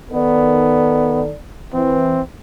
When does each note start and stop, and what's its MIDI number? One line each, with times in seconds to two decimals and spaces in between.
0.11 1.31 51
0.11 1.22 59
0.11 1.31 69
0.11 1.31 74
1.74 2.19 52
1.74 2.22 60